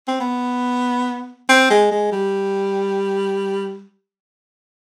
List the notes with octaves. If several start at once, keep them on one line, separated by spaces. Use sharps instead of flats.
C4
B3
C4
G#3
G#3
G3